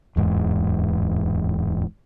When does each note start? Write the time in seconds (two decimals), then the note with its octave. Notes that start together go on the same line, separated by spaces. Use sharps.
0.16 D1 E2 G#2